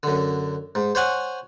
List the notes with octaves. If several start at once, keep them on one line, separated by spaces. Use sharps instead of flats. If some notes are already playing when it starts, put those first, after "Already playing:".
F#2 D3
G#2
C5 C#5 F#5 G#5